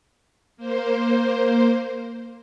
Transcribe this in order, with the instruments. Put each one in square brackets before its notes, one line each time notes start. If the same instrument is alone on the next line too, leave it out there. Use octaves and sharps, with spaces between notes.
[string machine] A#3 C5